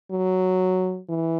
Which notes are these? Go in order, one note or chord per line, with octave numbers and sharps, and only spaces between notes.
F#3
E3